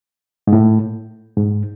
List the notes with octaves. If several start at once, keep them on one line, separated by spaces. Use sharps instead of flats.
G#2
A2
G#2